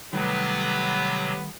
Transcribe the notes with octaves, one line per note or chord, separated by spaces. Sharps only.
C3 D#3 F#3 G3 A3 B3